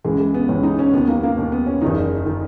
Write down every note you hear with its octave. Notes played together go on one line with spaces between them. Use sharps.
C#2 C#3 E3 G#3
G#3
B3
C#2 C#3 E3 C#4
D#4
C#4
D#2 D#3 B3
A#3
A#3
D#2 D#3
B3
C#4
F#1 E2 D#3 D#4
D#3